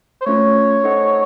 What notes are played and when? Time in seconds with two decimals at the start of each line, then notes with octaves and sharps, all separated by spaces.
0.22 C5
0.26 A3 C#4 F4 C#5
0.84 D#4 A4 C5 D#5 F#5